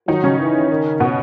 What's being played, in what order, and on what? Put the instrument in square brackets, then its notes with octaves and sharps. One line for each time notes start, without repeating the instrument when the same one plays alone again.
[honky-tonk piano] D#3 D#4 [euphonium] F#3
[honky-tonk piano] C#3 C#4
[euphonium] E3
D#3
[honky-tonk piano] B2 B3